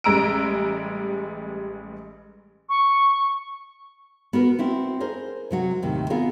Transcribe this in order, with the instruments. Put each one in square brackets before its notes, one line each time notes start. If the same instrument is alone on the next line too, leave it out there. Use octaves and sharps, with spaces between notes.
[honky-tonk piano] A1 G3 G#3 A#5 E6 D7
[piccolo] C#6
[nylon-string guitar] B3 F#4 A#4 B4
C4 E4 F#4
G#4 A#4 C5
C3 F#3 F#4
D#2 A2 C3 D#3
B3 C4 F4 G#4 A#4